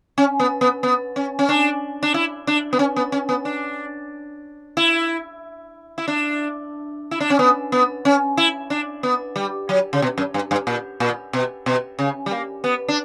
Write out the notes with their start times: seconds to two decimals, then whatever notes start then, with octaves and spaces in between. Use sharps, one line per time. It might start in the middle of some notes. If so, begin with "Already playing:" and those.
0.18 C#4
0.40 B3
0.61 B3
0.83 B3
1.16 C#4
1.39 C#4
1.49 D4
2.03 D4
2.14 E4
2.47 D4
2.73 B3
2.79 C#4
2.96 B3
3.12 C#4
3.29 B3
3.45 D4
4.77 E4
5.98 E4
6.08 D4
7.11 E4
7.20 D4
7.30 C#4
7.39 B3
7.72 B3
8.05 C#4
8.37 E4
8.70 D4
9.03 B3
9.36 G3
9.69 F#3
9.93 C#3
10.02 B2
10.18 F#2
10.34 G2
10.51 G2
10.67 A#2
11.00 A#2
11.33 B2
11.66 B2
11.99 C#3
12.26 G3
12.31 A#3
12.64 B3
12.88 D4